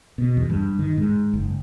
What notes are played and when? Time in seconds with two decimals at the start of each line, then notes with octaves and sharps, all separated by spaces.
0.18 B2
0.37 E2
0.50 G2
0.79 D#3
0.98 G#2
1.33 F#1